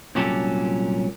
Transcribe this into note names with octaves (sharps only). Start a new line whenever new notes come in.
C2 A#2 F#3 C#4 G4 A4